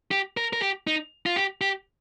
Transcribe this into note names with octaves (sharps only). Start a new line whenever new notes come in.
G4
A#4
A#4
G4
D#4
F4
G4
G4